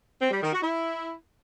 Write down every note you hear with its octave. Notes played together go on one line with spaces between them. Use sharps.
C4
G3
D#3
F#4
E4